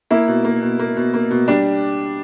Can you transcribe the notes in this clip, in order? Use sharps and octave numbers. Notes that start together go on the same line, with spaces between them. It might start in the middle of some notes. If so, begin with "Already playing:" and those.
A#3 E4
B2
A#3
B2
A#3
B2
A#3
B2
G3 D4